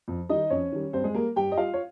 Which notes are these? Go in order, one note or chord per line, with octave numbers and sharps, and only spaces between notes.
F2
D#3 G3 D#4 D#5
F2 C#4 C#5
D#3 G3
G2 C4 C5
G#3 G#4
G3 A#3 A#4
G2 G4 G5
D#5
G3 F4 F5
C#5